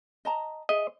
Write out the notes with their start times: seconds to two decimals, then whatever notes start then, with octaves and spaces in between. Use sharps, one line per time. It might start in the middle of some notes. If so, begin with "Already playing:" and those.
0.25 D#5 A5 A#5
0.69 G#4 D#5 E5